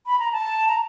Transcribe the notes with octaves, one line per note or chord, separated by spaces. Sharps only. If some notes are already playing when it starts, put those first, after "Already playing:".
B5
A#5
A5
A#5